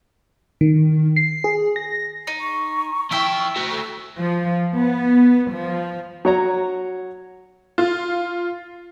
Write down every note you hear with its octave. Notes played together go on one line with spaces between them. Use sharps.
D#3
C7
G#4
A#6
D#4
C#6
F3 E4 E5 G5
A3 F#4
A4
F3
B3
F3
F#3 C#5 A#5
F4